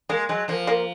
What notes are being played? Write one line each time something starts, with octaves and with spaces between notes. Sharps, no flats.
G#3 A#3
F#3 G#3
F3 A#3
A#3